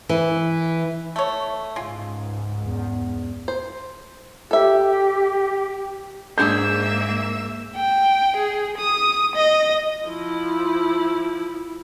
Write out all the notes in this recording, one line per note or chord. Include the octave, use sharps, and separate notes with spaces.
E3
A3 C#5
C#2 G#2 G#3 F4
E2
C5
G4 A4 E5
G#2 G#3 A#3 D4 G#4 E5 E6 G6
G5
G#4
D#6
D#5
F3 E4